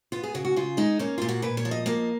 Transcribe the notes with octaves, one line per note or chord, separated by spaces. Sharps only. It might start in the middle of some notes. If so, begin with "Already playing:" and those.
B3 F4
G#4
C#3 F#4
F#4
C#3 F4
G#3 D#4
A#3 C#4
A#2 F4
F#4
A#2 B4
C#5
F3
D#5
A#3 D#5